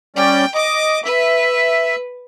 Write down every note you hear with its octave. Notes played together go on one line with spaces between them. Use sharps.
G3 C#4 D5 G5
D#5 D6
B4 E5